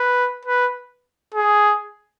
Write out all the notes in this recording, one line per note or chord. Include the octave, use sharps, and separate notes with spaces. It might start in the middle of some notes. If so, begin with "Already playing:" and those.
Already playing: B4
B4
G#4